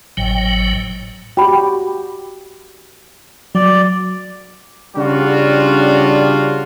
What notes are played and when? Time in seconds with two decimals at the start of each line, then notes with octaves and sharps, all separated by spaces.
0.17 G#1 A2 F#3 G5
1.37 F#4 G4 G5 B5
3.55 F#3 D5
4.96 C#3 G3 C#4 D4 F4 F#4